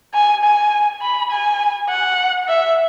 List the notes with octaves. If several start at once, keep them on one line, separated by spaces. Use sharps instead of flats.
G#5
G#5
B5
G#5
F#5
E5